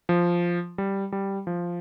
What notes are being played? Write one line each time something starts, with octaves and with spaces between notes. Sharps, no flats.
F3
G3
G3
F3